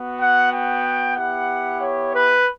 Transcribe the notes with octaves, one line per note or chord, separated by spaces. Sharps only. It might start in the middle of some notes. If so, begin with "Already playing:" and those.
Already playing: B3 F#4
F#5
G5
B3 E4 G4 F#5
C#5
B4